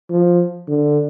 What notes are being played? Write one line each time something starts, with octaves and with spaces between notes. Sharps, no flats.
F3
D3